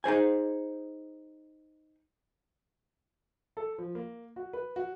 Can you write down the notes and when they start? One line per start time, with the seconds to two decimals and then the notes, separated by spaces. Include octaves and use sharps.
0.04 D#4 G#4 C5 G#5
3.57 A4
3.78 F3
3.95 A#3
4.36 F#4
4.53 B4
4.76 F#4